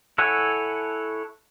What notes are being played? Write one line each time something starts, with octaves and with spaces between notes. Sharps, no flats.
E4 A4 C#5 F#5 G#5